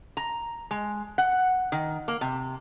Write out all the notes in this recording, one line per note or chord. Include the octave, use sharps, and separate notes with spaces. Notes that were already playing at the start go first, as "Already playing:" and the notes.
A#5
G#3
F#5
D#3
A#3
C3